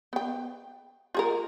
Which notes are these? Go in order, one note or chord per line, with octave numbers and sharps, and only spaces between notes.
B3 G5
F4 G#4 A#4